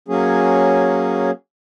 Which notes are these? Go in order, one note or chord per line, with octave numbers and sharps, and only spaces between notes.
F#3 A#3 C#4 G#4